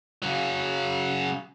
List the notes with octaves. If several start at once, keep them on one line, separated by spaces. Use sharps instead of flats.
C#3 F#3